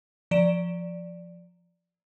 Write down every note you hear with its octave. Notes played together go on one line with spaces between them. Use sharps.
F3 D5 D7 E7